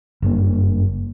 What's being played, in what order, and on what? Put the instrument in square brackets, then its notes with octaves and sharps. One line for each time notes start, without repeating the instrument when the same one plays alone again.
[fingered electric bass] F#1 G2 A#3